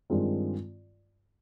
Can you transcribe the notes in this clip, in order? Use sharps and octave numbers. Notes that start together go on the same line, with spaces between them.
G2 D#3 G#3 C4 F4